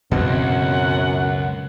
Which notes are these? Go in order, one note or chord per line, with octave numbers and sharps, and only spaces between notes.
C#2 F#2 B2 E3 C4 F#5